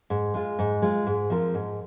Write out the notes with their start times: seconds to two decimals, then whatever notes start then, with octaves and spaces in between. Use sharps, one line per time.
0.10 G#2
0.34 G#3 F4
0.59 G#2
0.82 G#3 F4
1.07 G#2
1.30 F3 C4 F4 A#4
1.55 G#2